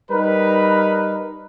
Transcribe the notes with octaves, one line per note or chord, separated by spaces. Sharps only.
G3 D#4 A#4 B4